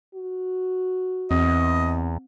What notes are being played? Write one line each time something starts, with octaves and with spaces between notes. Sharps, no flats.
F#4
E2 C4 D#5